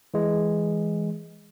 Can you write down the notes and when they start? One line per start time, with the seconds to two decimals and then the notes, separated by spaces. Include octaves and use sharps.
0.14 E3 G#3